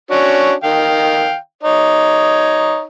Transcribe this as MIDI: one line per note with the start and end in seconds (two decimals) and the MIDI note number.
0.11 0.53 61
0.11 0.53 62
0.11 0.53 66
0.64 1.36 51
0.64 1.36 77
0.64 1.36 79
1.63 2.84 63
1.63 2.84 73